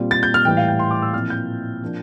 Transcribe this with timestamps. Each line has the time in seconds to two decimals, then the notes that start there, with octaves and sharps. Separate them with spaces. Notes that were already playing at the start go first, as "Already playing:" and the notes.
Already playing: A#2 G3 C4 F4
0.11 A6
0.23 G6
0.34 F6
0.45 A2 E3 G3 G5
0.57 F5
0.68 G5
0.79 C6
0.91 D6
1.02 E6
1.13 A#2 F3 C4 E4 F6
1.30 G6
1.83 F3 A#3 D4